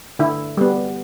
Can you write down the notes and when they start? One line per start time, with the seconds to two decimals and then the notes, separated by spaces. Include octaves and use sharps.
0.19 D3 E4
0.57 G3 B3